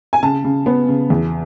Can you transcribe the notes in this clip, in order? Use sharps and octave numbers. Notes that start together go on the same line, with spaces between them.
G#5
C#3 A5
C#3
B3
C#3
E2